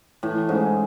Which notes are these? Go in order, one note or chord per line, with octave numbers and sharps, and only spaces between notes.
A2 E3
G#2 G#3 C#4